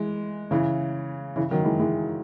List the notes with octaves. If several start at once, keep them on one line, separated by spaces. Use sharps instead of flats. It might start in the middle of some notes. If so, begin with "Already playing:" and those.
Already playing: E3 G#3
C#3 E3
C#3 E3
D#3 F#3
E3 G#3
E3 G#3